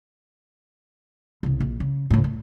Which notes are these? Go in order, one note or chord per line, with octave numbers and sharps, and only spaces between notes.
C2 C#3
A#1
C#3
C#2 A2
A2